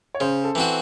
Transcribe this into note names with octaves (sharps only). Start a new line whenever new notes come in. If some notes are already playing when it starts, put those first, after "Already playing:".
C#5
C#3 C5
A4
E3 C4 F#4